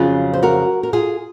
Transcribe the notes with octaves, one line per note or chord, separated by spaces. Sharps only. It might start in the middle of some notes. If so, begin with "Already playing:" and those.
Already playing: F2 C#3 F#3 F4 G#4
C5
F#4 A#4
A#4
F4 G#4